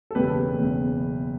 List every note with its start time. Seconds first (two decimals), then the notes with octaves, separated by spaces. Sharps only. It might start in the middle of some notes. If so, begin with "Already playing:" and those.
0.11 A4
0.15 F#1 E2 B2 G4 B4
0.58 F#1 E2 B2